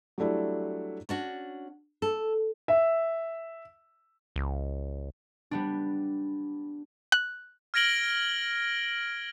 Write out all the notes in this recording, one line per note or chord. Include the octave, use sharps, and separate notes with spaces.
F#3 G3 A3 D4 E4
C#4 D4 F#4
A4
E5
C#2
G3 B3 D4
F#6
F6 G#6 A#6 D7 F#7 G7